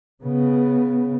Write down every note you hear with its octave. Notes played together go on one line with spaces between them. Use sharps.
C#3 B3